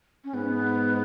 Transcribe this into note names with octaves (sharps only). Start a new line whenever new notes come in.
C#4
G#2 B3